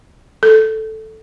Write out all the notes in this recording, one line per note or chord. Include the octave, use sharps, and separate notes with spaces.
A4